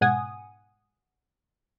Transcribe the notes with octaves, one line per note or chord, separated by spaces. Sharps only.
G#2 B2 F#5 G#5 D#6